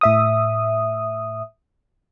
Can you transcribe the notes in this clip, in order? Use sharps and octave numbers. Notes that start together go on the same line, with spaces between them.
A2 E5 D#6